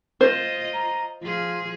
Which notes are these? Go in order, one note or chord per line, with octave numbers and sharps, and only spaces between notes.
F4 C5 D#5
A#5
F3 F4 G#4